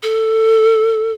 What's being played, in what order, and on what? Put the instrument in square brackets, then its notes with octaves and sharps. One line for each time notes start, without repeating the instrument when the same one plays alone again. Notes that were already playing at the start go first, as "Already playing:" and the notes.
[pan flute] A4